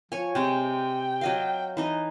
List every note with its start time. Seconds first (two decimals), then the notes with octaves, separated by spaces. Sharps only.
0.12 F3 C#5 G#5
0.35 C3 G#3 G5
1.21 F#3 D#5 F5
1.77 E3 D#4 D#5